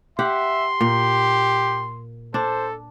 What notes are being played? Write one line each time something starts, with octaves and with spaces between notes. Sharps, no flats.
G4 E5 F#5 C6
A#2 G4
D4 A4 C5